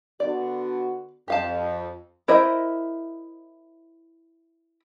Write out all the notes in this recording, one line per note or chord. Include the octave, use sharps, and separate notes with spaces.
D3 B3 F#4 D5
F2 G4 F5 A5
E4 A#4 C5 D#5 E5